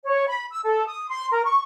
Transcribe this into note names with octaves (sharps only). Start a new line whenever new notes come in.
C#5
B5
E6
A4
D#6
C6
A#4
C#6